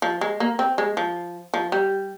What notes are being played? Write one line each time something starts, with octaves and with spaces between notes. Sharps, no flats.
F3
G#3
A#3
C4
G#3
F3
F3
G3